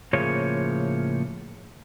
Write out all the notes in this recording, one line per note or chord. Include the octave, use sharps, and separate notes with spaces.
A2 C#3 F3 A#3 G#4 C#5